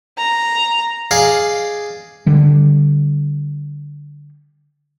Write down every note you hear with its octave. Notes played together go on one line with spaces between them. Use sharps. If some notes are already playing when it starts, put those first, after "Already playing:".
A#5
G#4 D5 D#5 F5
D3 G3